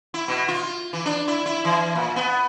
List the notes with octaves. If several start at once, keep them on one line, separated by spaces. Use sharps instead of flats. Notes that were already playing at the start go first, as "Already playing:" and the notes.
E4
B2
F4
E3
D4
E4
E4
E3
A#2
B3